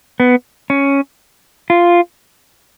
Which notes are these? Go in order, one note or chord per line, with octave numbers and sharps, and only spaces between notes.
B3
C#4
F4